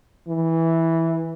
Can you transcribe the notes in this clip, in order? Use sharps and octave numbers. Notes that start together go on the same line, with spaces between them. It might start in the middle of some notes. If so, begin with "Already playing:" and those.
E3